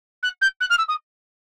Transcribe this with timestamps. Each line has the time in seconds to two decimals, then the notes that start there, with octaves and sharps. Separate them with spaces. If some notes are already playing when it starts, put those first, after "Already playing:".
0.23 F#6
0.41 G6
0.61 F#6
0.70 F6
0.78 E6
0.88 D#6